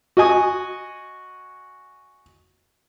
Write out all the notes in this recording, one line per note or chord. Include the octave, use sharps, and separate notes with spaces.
F#4 D#5 G#5 D#6